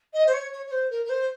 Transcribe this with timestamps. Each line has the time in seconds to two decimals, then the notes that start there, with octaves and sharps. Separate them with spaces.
0.14 D#5
0.26 C5
0.33 C#5
0.52 C#5
0.66 C#5
0.71 C5
0.90 A#4
1.05 A#4
1.09 C5